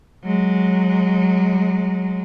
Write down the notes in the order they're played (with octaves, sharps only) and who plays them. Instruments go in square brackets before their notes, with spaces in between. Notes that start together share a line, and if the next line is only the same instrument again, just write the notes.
[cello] F#3 G#3